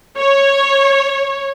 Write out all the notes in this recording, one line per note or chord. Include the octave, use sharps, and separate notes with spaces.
C#5